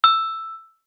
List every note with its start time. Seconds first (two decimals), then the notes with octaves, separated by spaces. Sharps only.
0.04 E6